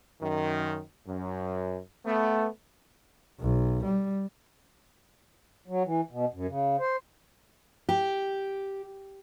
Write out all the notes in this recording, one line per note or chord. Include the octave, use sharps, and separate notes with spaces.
F#2 D#3
F#2
A3 B3
B1
G3
F#3
E3
B2
F#2
C#3
C5
G4